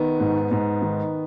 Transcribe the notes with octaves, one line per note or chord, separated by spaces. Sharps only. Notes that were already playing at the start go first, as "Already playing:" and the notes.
Already playing: D#3 B3
G#2
G#2
D#3